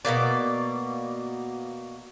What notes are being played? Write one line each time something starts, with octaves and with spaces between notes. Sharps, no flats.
B2 F#3 A#3 D5